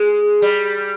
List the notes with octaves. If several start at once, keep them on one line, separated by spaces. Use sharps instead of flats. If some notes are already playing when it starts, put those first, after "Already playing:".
Already playing: G#3
G3